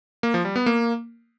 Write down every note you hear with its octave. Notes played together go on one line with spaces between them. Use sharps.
A#3
F3
G3
B3
A#3